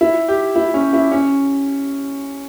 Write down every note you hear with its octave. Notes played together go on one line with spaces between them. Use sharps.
E4
G4
E4
C#4
E4
C#4